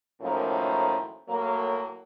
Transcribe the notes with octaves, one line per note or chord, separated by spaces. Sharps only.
F#2 A2 D#3 F3 A#3
A2 F#3 A#3